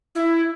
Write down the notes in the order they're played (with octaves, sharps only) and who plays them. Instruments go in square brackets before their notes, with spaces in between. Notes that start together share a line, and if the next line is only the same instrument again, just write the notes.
[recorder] E4